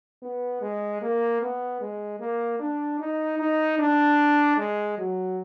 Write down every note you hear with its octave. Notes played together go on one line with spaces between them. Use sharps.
B3
G#3
A#3
B3
G#3
A#3
D4
D#4
D#4
D4
G#3
F#3